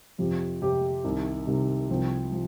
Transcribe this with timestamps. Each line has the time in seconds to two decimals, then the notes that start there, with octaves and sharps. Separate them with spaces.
0.18 F2 C3 F3 C4 G4
0.61 F2 C3 F3 C4 G4
1.04 C2 C3 D#3
1.47 C2 C3 D#3
1.89 C2 C3 F3 C4
2.32 C3 F3